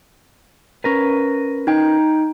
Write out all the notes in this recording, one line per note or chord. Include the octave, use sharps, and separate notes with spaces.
C#4 A#4 B4
D#4 G5